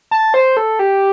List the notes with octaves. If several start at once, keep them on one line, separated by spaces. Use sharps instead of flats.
A5
C5
A4
G4